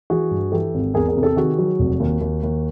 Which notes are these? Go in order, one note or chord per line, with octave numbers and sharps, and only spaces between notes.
E3 F#4 G#4
G2
E3 G4 A4
G#1
E2 G#4 A#4
G#4 A#4
C3
G4 A4
D#3 F#4 G#4
F#3
F1
D#2
D#2
D#2